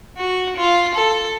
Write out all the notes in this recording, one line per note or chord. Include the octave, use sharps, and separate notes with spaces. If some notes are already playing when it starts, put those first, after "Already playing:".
F#4
F4
A4